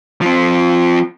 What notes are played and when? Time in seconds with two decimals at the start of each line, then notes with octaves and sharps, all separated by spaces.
0.21 F3 C4